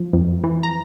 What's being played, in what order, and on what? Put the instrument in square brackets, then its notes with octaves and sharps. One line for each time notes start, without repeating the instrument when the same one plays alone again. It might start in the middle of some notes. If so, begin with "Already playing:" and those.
Already playing: [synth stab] F3
F2
E3
A#5